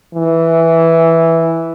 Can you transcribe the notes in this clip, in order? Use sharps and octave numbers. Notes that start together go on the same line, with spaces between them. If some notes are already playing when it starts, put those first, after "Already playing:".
E3